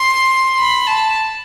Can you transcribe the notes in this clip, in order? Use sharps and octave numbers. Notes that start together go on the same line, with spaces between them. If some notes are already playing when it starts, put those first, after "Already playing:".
Already playing: C6
B5
A5